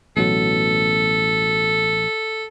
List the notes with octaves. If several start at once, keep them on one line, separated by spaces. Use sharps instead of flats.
A1 B2 F#3 A4